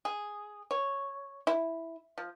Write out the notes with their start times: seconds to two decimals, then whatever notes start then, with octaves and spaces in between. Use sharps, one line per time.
0.05 G#4
0.71 C#5
1.47 E4
2.18 F3